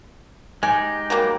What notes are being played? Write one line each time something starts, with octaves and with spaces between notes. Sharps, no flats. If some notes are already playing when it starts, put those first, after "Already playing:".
G#3 D#4 G4 G#5
F#3 G3 A#3